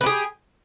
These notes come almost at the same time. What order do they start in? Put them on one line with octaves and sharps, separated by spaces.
B4 G4 G#4